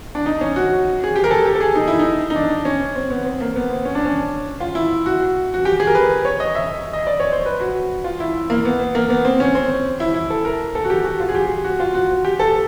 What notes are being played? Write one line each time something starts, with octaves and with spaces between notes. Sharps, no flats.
D4
D#4
C#4
F#4
G#4
G4
A#4
A4
G4
A4
G#4
D#4
E4
D#4
D#4
D4
C#4
C4
B3
C4
A#3
B3
C4
C#4
D4
C#4
F4
E4
F#4
F#4
G4
G#4
A#4
B4
C#5
D#5
E5
D#5
D5
C#5
C5
B4
F#4
F4
E4
A#3
B3
A#3
B3
C4
C#4
C4
E4
E4
A4
A#4
A4
F#4
G4
F#4
F4
G#4
G4
F#4
F4
F#4
G4
A4